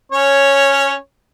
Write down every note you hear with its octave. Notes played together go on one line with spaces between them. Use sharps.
C#4 C#5